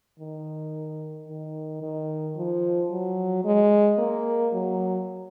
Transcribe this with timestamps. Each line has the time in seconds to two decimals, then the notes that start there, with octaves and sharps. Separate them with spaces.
0.20 D#3
1.29 D#3
1.82 D#3
2.37 F3
2.91 F#3
3.45 G#3
3.99 A#3
4.54 F#3